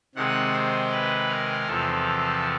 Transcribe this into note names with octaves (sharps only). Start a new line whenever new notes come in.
C3 D#3 G#3 F#5
C5
B4
A#4
E2 C3 F3 A4